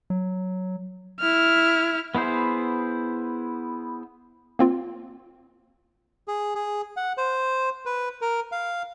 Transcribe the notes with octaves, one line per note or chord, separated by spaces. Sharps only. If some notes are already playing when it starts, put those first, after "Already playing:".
F#3
E4 F6
B3 E4 G#4 C5
A#3 C4 F4
G#4
G#4
F#5
C5
B4
A#4
F5